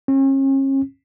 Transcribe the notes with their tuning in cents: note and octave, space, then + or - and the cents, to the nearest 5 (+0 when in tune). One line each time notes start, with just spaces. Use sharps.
C#4 -40